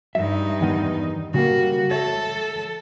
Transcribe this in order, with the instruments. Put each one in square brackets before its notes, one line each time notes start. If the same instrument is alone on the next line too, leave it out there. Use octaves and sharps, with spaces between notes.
[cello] G2 D#4 [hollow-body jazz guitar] E5
[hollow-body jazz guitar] E2 D#3 B3
[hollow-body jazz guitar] C#3 G3 A#3 [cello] F#4
[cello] A4 [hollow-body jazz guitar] C#5 E5